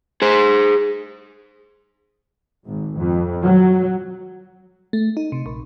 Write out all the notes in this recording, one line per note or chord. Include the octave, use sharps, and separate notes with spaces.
G#4 C5
G#1
F2
F#3
A3
D#4
C3
A#1